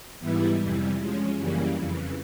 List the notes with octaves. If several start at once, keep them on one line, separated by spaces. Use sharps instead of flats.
G#2 E3 G3 B3 E4
F2 C3 E3 G3
F3 G#3 C#4
F#2 C#3 E3 G3 A#3
F2 C#3 E3